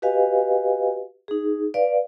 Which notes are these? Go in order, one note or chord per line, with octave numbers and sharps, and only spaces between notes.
F#4 G4 B4 D#5 F5 G#5
D#4 G#4
B4 D5 F5